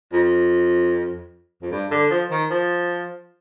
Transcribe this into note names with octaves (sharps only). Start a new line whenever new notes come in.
F2
F2
G2
D3
F3
D#3
F3